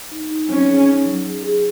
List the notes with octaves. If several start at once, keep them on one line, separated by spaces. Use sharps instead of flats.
D#4
D#4
F#3 C#4
G#4
D#4
F#3
G#4
G#4